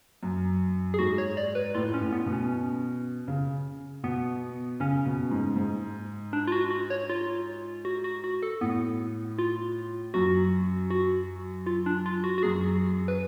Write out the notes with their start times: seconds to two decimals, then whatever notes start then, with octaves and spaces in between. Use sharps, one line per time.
0.23 F#2
0.94 G#4
0.99 G#2 F#4
1.18 C#5
1.37 D5
1.55 B4
1.75 A2 F4
1.94 C#4
2.01 A2
2.13 B3
2.26 B2
2.33 C#4
3.28 C#3
4.03 B2 B3
4.80 C#3 C#4
5.05 B2
5.31 G#2
5.56 G#2
6.33 D4
6.47 F4
6.52 F#4
6.71 F#4
6.90 C#5
7.09 F4
7.85 F#4
8.04 F#4
8.24 F#4
8.43 A4
8.61 A2 B3
9.39 F4
10.14 F#2 F#4
10.91 F#4
11.66 F4
11.86 D4
12.06 F4
12.24 F#4
12.38 F#4
12.43 F#2 G#4
13.08 B4